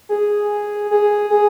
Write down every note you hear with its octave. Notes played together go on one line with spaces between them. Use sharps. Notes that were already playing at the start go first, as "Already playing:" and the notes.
G#4
G#4
G#4